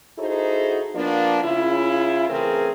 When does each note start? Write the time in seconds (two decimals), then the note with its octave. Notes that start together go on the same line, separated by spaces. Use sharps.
0.18 D#4 E4 F#4 G#4 A4 C5
0.95 F3 A#3 B3 D4
1.43 C#3 E4 F4
2.28 C#3 E3 A3 C4 G#4 A#4